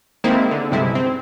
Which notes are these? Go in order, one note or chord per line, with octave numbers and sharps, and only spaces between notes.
D#3 G#3 A#3 C4 E4
D3
B1 G2 C3 G#3 E4
C4